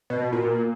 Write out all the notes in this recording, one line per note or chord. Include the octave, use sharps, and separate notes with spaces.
B2
A#2